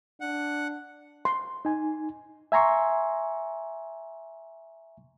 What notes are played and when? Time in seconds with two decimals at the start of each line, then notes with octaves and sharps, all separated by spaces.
0.21 D4 F#5
1.25 C6
1.65 D#4 G#5
2.52 E5 G#5 A#5 C6 C#6